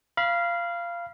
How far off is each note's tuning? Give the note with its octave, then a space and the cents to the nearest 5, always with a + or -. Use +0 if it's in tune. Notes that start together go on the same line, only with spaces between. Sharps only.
F5 -15 B5 -25